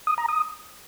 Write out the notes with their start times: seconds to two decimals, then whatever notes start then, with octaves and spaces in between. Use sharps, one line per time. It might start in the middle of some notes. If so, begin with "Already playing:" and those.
0.07 D#6
0.18 A#5
0.29 D#6